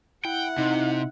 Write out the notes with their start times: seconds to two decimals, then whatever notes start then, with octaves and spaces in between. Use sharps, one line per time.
0.25 E4 F#5 G5
0.58 C3 D#4